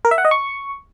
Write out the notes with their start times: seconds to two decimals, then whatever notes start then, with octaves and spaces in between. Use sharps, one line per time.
0.05 A#4
0.11 E5
0.18 F#5
0.25 D#5
0.31 C#6